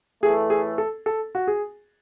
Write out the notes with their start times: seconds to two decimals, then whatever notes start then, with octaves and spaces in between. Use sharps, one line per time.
0.23 A2 E3 A3 G#4
0.50 G#4
0.78 A4
1.06 A4
1.35 F#4
1.47 G#4